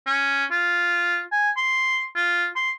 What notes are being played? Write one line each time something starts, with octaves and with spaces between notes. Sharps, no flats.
C#4
F4
G#5
C6
F4
C6